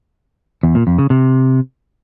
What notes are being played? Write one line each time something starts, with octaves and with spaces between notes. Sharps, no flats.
E2
A#2
F2
C#3
C3